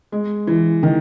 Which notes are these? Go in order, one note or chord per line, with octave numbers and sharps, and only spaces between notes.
G#3
E3
D#3